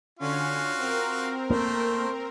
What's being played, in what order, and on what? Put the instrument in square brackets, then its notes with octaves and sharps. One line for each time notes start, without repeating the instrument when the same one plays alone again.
[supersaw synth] D3 C#4 [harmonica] F4 F#4
[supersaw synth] C4 A#4
[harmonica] A3 C5 [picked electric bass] A#3